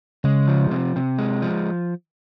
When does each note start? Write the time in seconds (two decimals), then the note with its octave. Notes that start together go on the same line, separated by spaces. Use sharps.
0.24 C#3 G#3
0.47 F3
0.71 C3
0.96 C3
1.19 G#3
1.42 F3